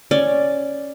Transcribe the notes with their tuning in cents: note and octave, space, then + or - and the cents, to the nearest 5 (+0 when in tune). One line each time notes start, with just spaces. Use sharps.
C#4 +0 D5 +0